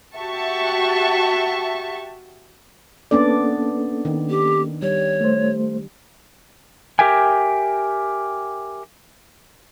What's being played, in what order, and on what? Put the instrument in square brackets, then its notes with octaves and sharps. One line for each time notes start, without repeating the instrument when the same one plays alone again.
[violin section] F#4 G4 E5 A5 C#6
[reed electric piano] A#3 C#4 A4 [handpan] B3 D4 D5
[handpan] D#3
[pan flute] G4
[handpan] G3 [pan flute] C#5
[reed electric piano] A3 C5
[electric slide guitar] G4 A#4 E5 G5 G#5